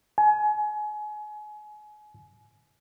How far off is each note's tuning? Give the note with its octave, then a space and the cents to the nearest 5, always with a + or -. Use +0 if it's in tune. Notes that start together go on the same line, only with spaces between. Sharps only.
G#5 +30